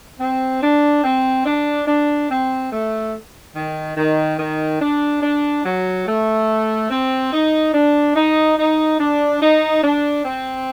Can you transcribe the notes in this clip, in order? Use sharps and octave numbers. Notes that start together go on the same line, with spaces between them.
C4
D4
C4
D4
D4
C4
A3
D#3
D#3
D#3
D4
D4
F#3
A3
C4
D#4
D4
D#4
D#4
D4
D#4
D4
C4